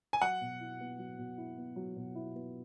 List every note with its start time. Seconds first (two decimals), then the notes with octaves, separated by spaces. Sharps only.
0.13 G#5
0.21 F#3 F#5
0.41 B2
0.61 E4
0.80 B3
0.99 F#3
1.18 B2
1.38 E4
1.58 B3
1.76 F#3
1.96 B2
2.15 E4
2.35 B3